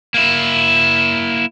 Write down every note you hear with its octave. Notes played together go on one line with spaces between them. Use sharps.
A#3 E4